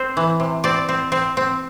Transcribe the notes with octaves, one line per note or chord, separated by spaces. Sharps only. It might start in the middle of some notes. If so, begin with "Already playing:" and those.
Already playing: C4 C5
E3
C3
C4 D5
C4
C4
C4